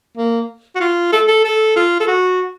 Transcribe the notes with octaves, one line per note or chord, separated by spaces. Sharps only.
A#3
F#4
F4
A4
A4
A4
F4
A4
F#4